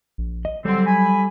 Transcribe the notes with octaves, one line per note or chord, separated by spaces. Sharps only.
A#1
D#5
D3 F#3 G3 C4 A4
G#5 B5